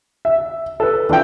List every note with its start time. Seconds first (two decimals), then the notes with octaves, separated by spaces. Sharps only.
0.25 E5
0.80 A4 B4
1.09 E3 D4 F4 G5